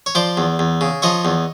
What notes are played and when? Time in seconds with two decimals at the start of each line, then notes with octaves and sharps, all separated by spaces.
0.06 C#5
0.15 F3 C5 D5
0.37 E2
0.59 E2
0.81 C#3
1.02 F3 C#5 D#5
1.25 E2